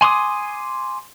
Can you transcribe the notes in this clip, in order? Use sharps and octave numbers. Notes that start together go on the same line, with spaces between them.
G#5 C6 D6 D#6